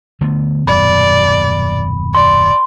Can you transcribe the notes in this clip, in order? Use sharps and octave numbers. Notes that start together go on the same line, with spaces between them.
D3 A3 B3
D#1 F#2 B2 D5 B5
D5 C6